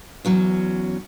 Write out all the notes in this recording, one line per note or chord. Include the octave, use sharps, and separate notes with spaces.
E2 F#3 C#4